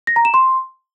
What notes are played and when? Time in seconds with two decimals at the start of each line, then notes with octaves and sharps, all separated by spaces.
0.07 A#6
0.16 A#5
0.25 E7
0.34 C6